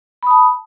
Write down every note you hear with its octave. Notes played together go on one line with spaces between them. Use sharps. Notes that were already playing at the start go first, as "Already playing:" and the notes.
A5 B5 D#6